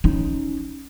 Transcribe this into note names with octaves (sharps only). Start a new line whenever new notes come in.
C#4 D#4